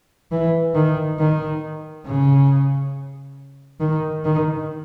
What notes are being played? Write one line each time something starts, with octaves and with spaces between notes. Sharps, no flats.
E3
D#3
D#3
C#3
D#3
D#3